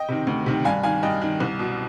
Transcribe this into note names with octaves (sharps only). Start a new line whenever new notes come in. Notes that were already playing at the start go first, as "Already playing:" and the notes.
Already playing: D#5 G5
C3 D#3
D2
C3 D#3
G2 F5 G#5
D#3 F5 G#5
G2 D#5 G5
D#3
C2
B2